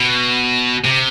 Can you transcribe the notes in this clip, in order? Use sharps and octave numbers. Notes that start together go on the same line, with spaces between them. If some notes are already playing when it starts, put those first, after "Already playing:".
Already playing: B2
C3